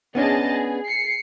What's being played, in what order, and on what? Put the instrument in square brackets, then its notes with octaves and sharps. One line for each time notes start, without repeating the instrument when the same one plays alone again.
[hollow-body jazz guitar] B3 C#4 D4 [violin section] G#4 D#5 A5
[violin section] G#4
C7 C#7